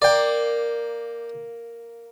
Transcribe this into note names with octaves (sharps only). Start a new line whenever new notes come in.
A#3 D5 G5